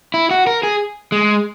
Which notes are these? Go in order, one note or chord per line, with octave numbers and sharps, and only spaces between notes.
E4
F#4
A#4
G#4
G#3